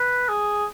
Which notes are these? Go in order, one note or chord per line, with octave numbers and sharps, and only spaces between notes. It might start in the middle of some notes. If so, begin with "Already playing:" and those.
Already playing: B4
G#4